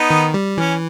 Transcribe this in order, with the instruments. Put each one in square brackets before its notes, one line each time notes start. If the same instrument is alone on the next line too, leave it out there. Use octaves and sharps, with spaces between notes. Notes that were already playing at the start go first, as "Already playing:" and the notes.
Already playing: [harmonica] B3 D#4
[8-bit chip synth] D#3
G3
[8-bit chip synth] E3 [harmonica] C#4